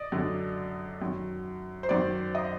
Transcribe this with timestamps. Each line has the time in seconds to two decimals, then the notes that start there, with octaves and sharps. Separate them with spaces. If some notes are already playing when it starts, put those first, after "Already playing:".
Already playing: D5 D#5
0.12 F#2 D3
1.01 F#2 D#3
1.83 C5
1.89 F#2 D#3 D5
2.35 D#5